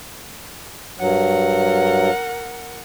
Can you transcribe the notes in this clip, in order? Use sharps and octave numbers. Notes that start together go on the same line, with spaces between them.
G2 F#3 A#4 F#5